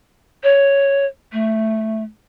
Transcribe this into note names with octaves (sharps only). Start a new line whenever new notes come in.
C#5
A3